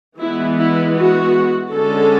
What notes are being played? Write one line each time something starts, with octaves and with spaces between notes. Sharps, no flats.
E3 G#3 B3 E4
E4
F#4
D3 G#3 C#4 A4